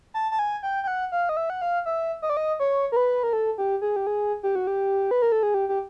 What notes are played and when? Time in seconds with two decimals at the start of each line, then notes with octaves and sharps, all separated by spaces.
0.14 A5
0.31 A5
0.39 G#5
0.63 G5
0.83 G5
0.87 F#5
1.12 F5
1.29 D#5
1.37 E5
1.50 F#5
1.62 F5
1.86 E5
2.22 D#5
2.30 D5
2.37 D#5
2.60 C#5
2.92 A#4
2.96 B4
3.23 A#4
3.33 A4
3.58 G4
3.82 G#4
3.96 G4
4.07 G#4
4.43 G4
4.55 F#4
4.67 G4
5.11 B4
5.22 A#4
5.32 A4
5.43 G#4
5.54 G4
5.69 G4